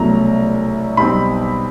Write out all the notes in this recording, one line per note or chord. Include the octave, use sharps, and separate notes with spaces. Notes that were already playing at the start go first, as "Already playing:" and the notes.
Already playing: C2 B2 F#3 A3 C#4 A#5
B1 B2 G3 C4 D#4 B5